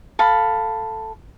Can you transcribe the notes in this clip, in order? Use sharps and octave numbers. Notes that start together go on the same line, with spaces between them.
A4 F5 B5